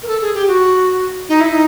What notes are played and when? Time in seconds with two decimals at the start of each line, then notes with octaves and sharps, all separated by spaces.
0.03 A#4
0.08 A4
0.21 G#4
0.35 G4
0.48 F#4
1.29 D#4
1.41 E4
1.52 D#4